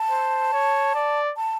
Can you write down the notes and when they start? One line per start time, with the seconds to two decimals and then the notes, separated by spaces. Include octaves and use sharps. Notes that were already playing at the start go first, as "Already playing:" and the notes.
Already playing: A5
0.11 C5
0.53 C#5
0.95 D5
1.37 A5